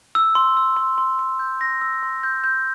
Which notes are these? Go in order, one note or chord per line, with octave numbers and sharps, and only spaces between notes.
E6
C6
E6
C6
C6
C6
G6
A#6
E6
C6
G6
G6